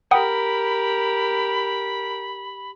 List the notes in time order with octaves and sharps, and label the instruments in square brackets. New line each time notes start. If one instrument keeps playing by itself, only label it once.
[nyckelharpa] G4 A#4 [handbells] F#5 G5 D#6 [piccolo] B5